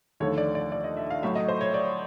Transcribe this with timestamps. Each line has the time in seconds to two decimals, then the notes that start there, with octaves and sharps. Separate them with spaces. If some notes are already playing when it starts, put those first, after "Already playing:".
0.20 D#2 D3 F3 A3 C#5
0.38 D5
0.55 D5
0.72 D5
0.84 D#5
0.97 E5
1.10 F5
1.23 A2 F#3 A3 E5
1.35 D#5
1.48 C5
1.61 C#5
1.74 D5